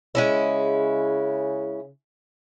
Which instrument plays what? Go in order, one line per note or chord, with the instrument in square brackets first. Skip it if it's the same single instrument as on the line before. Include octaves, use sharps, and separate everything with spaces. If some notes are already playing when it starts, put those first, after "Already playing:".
[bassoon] C#3 [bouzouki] G#3 C#4 E4